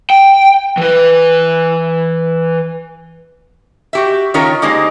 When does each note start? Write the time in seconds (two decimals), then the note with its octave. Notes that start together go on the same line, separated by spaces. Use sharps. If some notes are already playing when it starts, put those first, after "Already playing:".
0.10 G5
0.77 E3 B4
3.93 F#4 G4 E5
4.34 D#3 C#4 F4 A#4 C#5
4.62 D3 G#3 A#3 D#4 G4 C5